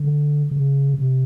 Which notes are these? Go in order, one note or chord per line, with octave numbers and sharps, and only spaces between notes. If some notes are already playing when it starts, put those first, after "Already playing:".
Already playing: D3
C#3
C3